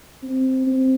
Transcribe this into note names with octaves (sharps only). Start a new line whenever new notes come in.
C4
C4